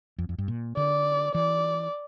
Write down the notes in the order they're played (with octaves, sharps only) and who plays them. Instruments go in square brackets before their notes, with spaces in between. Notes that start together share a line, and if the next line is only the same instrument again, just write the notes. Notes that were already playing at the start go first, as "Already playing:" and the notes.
[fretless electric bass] F2
F2
G2
A#2
[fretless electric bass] D3 [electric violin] D5
[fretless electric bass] E3 [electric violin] D5